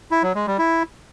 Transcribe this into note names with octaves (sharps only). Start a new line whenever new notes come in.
E4
F#3
G#3
G3
E4